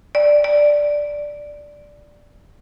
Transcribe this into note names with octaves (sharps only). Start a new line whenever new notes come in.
D5
D5